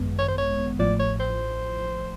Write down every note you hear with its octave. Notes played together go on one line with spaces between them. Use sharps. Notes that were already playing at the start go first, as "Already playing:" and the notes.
Already playing: G#1 F#2 D#3 G#3 B3
C#5
C5
C#5
A1 A2 F3 D5
C#5
C5